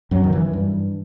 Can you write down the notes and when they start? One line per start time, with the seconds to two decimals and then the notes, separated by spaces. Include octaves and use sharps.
0.11 F#2 F#3
0.24 D#3
0.32 E3
0.53 G2